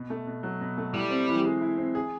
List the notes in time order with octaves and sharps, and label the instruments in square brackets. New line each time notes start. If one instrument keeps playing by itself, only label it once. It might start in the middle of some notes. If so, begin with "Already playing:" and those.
Already playing: [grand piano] B2
A3
B2
F#3
B2
A3
[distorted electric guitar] G3 [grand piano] E4
[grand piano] C4
E3
G#3
E4
C4
G#4